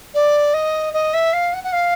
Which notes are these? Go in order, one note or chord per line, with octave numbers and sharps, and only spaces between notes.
D5
D#5
D#5
E5
F5
F#5
F#5
F5